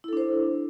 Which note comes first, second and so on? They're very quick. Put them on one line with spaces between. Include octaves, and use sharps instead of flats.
E4 A4 D4 C5